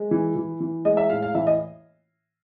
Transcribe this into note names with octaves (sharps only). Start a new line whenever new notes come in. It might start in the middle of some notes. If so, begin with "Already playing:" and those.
Already playing: G#3
E3
E3
E3
G#3 D#5
E5
A2 F5
F5
E3 E5
D#5